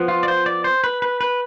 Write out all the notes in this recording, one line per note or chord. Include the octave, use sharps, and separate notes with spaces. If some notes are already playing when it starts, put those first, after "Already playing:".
Already playing: F3 B3
F4
D5
C5
D5
C5
B4
B4
B4